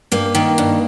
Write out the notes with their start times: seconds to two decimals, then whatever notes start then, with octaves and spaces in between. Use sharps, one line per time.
0.12 G2 A#3
0.35 D#3
0.58 G2